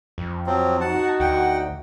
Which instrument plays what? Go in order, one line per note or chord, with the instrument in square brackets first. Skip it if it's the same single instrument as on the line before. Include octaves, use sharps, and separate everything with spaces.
[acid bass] F2
[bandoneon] F3 F#3 C4
[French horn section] D#4 F#4 [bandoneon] F#5 A5
[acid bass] D2 [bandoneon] F#5 G5